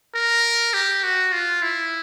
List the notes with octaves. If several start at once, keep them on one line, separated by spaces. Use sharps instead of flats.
A#4
G4
F#4
F4
E4